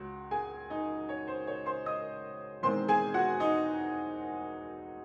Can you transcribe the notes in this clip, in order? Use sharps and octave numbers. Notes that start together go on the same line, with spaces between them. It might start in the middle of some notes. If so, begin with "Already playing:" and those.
Already playing: C#2 C#3 G#3 F#4
G#4 G#5
D#4 D#5
C#5
C5
C#5
C5 C6
D#5 D#6
E1 E2 D#3 G#3 C4 C5 C6
G#4 G#5
F#4 F#5
D#4 D#5